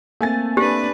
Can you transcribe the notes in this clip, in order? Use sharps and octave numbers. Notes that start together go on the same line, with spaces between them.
A3 A#3 C4 G#5 A6
D4 G4 B4